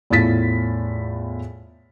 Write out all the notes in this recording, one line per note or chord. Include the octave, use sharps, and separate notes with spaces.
E2 A2 F4 A6 B6